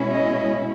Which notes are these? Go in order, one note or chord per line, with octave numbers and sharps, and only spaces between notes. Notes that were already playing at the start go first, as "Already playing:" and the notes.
Already playing: B2 G#3 C#4 E4
D#5